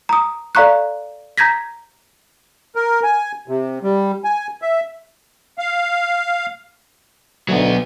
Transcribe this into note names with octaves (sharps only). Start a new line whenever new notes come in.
A#5 D#6
A4 D5 F5 A#5 C#6 F#6
A#5 G6 G#6 A#6 B6
A#4
G#5
C3
G3
G#5
E5
F5
D2 F#3 B3